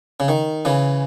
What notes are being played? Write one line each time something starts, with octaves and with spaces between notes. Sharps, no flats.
C#3
D#3
C#3 E3